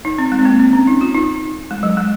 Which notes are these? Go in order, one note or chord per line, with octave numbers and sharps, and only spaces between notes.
D#4
C4
G#3
C4
A#3
C4
C#4
D#4
F4
D#4
G#3
F#3
G#3